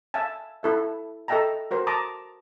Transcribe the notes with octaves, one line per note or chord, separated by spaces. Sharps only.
E5 F5 G#5 A5
E4 A4 E5
A4 D#5 E5 G5 A5 A#5
F#4 A#4 C5
A5 A#5 D6 D#6